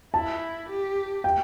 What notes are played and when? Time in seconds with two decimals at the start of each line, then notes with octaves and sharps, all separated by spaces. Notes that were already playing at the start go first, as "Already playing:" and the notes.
0.14 E4 A5
0.69 G4
1.24 G5